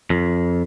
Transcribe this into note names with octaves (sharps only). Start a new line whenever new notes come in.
F2